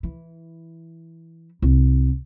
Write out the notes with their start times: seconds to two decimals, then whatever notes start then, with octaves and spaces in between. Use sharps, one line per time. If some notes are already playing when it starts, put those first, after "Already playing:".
0.03 E3
1.62 C2